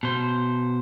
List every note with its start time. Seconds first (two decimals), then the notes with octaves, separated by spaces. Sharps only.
0.03 B2 C5